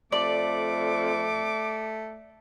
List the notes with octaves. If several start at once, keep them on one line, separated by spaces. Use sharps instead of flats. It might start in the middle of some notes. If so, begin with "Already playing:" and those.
F2 A3 D5 D6